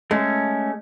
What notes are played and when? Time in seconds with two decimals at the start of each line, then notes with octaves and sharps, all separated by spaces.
0.11 G#3 A3 C#4